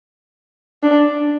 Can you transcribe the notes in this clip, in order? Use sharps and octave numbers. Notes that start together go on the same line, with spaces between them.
D4